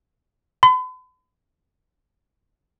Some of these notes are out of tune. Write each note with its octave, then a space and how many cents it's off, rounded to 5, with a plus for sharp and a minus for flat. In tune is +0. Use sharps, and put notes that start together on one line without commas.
B5 +45